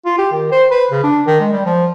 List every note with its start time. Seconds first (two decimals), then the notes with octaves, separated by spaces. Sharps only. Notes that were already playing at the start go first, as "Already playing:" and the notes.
0.06 F4
0.18 G4
0.32 D#3
0.52 C5
0.71 B4
0.91 C#3
1.04 D4
1.27 D#3
1.40 G#3
1.52 G3
1.66 F3